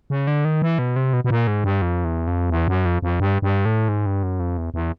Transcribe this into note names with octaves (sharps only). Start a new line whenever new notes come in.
C#3
D3
D#3
E3
B2
C3
B2
B2
A#2
G#2
G2
F2
E2
F2
E2
F#2
F2
F2
G2
G2
A2
G#2
G2
F#2
F2
E2
E2